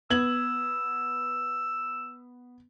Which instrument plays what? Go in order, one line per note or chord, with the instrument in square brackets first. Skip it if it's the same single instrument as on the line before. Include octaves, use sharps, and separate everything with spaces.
[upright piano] B3 G#6 F#7 [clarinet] E6